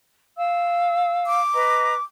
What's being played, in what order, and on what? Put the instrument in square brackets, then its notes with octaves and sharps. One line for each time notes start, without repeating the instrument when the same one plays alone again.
[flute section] F5 E6
[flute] D6
[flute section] B4 D#5 A#5